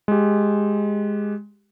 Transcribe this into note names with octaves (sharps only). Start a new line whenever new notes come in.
G#3 G4